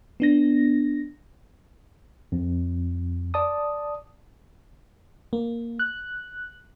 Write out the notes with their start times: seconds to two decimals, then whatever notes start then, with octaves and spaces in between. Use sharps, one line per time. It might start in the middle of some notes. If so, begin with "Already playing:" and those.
0.20 B3 D4 A#6
2.32 F2
3.34 D5 A5 D#6
5.33 A#3
5.79 F#6